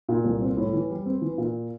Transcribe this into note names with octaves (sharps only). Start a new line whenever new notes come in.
A#2
C2
C4
A2
E3
G3
C4
E3
A#2